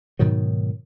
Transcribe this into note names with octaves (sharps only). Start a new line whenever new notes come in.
G#2 B2 D#3 F#3